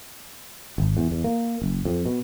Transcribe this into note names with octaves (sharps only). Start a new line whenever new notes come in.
G#1
E2
E2
A#3
F#1
F2
B2